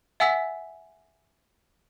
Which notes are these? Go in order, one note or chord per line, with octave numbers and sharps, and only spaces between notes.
E5 F#5 G#5 E6 B6